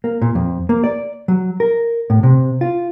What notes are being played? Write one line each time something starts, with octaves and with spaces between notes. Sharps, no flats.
A#3
A#2
F2
A#3
D5
F#3
A#4
A2
C3
F4